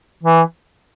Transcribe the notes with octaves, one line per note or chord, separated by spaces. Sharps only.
E3